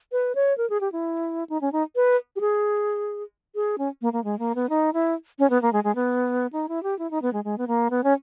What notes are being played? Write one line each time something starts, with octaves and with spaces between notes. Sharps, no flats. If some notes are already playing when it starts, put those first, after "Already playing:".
B4
C#5
A#4
G#4
G4
E4
D#4
C#4
D#4
B4
G4
G#4
G#4
C#4
A#3
A#3
G#3
A#3
B3
D#4
E4
C#4
B3
A#3
G#3
G#3
B3
D#4
E4
G4
E4
D#4
B3
G#3
G#3
B3
A#3
B3
C#4